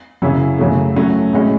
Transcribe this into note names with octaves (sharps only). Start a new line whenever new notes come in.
F#2 C#3 F#3 C#4 E4
F#2 C#3 F#3 A3
F#3 A3 C#4
A2 G#3 C#4